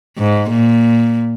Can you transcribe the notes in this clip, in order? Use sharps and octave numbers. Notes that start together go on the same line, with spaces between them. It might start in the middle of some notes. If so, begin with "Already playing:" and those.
G#2
A#2